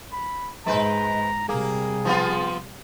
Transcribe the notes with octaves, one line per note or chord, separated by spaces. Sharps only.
B5
G#2 G#3 B4 C5 A#5
C3 G3 A#3 G#4
F3 B3 F4